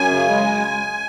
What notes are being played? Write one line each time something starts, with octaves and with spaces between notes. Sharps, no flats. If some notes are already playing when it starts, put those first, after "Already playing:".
Already playing: F#2 G#5
C#3
G#3